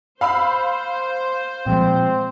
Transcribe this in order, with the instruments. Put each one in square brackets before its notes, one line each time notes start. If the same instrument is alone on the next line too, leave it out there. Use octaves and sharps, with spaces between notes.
[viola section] C5 [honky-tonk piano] F5 B5 E6
[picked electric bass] A#2 F3 G#3 [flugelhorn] C4